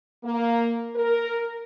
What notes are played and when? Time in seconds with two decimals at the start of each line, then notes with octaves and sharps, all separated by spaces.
0.24 A#3
0.96 A#4